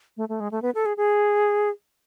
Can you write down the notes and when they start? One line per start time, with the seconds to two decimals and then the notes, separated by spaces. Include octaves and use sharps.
0.17 A3
0.29 A3
0.40 G#3
0.51 A3
0.62 B3
0.75 A4
0.86 G#4
0.97 G#4